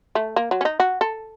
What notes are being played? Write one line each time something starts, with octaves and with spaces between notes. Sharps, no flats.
A3
A#3
F#3
C#4
D#4
F#4
A4